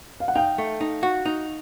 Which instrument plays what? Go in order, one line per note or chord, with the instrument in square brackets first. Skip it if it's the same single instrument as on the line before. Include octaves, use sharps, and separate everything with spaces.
[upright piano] F5
F#5
[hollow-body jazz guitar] D#4 [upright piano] F5 G5
[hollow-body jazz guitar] A3
D#4
F#4
D#4